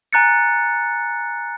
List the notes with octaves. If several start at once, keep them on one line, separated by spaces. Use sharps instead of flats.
G#5 A#5 F#6 A6 C#7